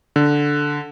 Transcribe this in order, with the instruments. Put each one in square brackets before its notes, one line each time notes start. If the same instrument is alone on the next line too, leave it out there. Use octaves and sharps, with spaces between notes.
[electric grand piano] D3